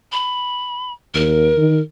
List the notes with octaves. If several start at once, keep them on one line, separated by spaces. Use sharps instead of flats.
B5
D#2 A#4
D#3